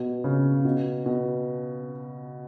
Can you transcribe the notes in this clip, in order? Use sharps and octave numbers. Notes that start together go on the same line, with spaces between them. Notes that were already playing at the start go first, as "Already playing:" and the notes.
Already playing: B2
C#3
B2
B2